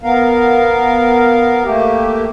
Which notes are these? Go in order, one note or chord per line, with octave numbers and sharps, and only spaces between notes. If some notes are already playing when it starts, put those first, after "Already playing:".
B3 A#4 F5
A3 A#3 G4